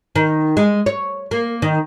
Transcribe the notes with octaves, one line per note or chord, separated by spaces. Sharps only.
D#3
G#3
C#5
A#3
D#3